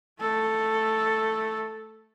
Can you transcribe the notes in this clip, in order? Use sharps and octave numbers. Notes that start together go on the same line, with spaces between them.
A3 A4